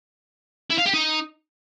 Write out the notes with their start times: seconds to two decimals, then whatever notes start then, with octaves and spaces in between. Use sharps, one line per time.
0.71 E4
0.78 F5
0.86 G4
0.94 D#4